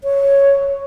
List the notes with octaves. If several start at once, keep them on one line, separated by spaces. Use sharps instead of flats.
C#5